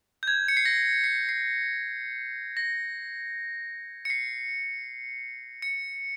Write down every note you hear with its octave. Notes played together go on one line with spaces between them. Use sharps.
G6
G#6
C#7
C7
A#6
C7
C7
A#6
C#7
C7
C#7